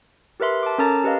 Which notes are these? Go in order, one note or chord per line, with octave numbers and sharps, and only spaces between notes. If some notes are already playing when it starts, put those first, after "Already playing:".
G4 A#4 B4 E5 C6
A5 D6
C#4 A4 A#4 A5 A#5 A6
G4 B4 D#5 F5